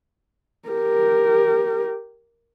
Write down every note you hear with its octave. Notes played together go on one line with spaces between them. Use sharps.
G4 A#4